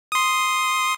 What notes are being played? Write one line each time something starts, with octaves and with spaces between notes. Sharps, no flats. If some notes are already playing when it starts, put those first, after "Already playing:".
C6 D#6